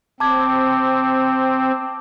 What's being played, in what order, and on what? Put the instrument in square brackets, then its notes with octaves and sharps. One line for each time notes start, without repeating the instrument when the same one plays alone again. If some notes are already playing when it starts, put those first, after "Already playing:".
[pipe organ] C4 [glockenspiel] A5 D6 G#6